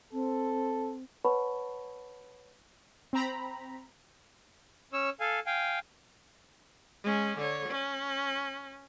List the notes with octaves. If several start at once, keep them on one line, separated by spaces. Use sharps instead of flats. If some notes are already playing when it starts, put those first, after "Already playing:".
C4 A4
B4 C#5 F#5 A5 B5 C#6
C4 A#5 B5
C#4 C#5 E6
A4 F5 G#5
F5 G5 G#5
G#3 C#4
D3 C#5
C#4